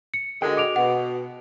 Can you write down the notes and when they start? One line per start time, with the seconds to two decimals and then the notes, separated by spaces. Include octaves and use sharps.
0.14 C#7
0.42 D3 G#3 F#4 A#4 D#5 G5
0.57 D6 D7 F7
0.76 B2 F#5